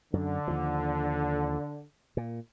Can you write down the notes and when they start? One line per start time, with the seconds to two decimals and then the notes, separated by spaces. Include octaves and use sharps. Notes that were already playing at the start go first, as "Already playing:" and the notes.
0.13 F#2 D3
0.48 D#2 F3
2.17 A#2